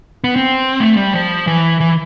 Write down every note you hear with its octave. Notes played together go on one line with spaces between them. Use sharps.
B3
C4
A3
G3
F3
E3
E3